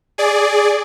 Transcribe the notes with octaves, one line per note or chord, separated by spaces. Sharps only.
G#4 D5